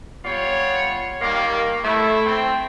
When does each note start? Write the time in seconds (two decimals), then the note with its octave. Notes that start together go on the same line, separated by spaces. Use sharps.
0.24 G3 B3 F4 C#5
1.21 D#3 G3 A#3
1.84 A3 E4
2.26 C4